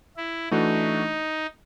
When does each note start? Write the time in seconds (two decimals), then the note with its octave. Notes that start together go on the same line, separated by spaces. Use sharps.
0.17 E4
0.51 E3 A3 D4 D#4 F#4